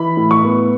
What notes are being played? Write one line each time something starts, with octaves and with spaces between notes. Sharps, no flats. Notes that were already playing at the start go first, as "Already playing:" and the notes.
Already playing: E3 B5
A2
C#6
B3